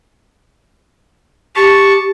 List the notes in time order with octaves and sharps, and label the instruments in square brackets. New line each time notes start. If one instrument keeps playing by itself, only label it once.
[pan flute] G4 [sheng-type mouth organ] A5 C#6